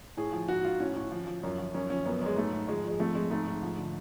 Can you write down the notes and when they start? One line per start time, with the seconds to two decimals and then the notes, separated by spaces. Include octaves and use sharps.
0.17 A2 G#4
0.33 F3
0.48 G#2 F#4
0.65 G#2 F4
0.80 A2 C#4
0.96 A2
1.12 F3
1.27 F3
1.43 F#2
1.58 F3
1.74 F#2 C#4
1.90 F3 C#4
2.05 F#2 B3
2.21 F#2 G#3
2.36 G#2 A3
2.53 G#2
2.68 F3 G#3
2.84 F3 G#3
3.00 F2 A3
3.15 F2 G#3
3.31 G#2 A3
3.47 G#2
3.63 F3
3.78 D3